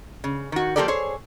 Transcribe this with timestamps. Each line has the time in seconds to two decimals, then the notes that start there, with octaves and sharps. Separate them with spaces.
0.24 C#3
0.52 D#3 F#4
0.76 F3 A#3 G4 A4 A#4 D5
0.88 G#4 C5 C#5